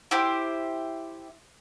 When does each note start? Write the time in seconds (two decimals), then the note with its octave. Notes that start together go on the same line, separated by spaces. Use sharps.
0.11 E4 G4 C5